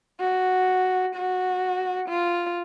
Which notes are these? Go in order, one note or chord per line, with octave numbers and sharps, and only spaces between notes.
F#4
F#4
F4